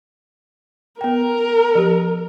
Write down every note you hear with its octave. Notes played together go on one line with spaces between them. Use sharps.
B3 A#4 G5
F3 G4